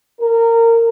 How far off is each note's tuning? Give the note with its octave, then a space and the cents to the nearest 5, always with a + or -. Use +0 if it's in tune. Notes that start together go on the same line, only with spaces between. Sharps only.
A#4 -20